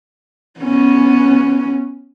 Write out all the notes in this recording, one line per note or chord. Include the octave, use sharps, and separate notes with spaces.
B3 C#4